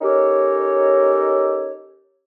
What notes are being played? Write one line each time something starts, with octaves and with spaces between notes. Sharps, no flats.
C#4 D#4 G4 A4 A#4 C#5